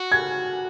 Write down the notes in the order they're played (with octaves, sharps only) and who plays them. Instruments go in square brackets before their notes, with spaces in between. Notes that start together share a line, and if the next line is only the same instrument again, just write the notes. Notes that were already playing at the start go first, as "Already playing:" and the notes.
Already playing: [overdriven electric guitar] F#4
[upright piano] G#6